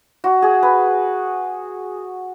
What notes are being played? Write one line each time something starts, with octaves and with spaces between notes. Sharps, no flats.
F#4
G#4
B4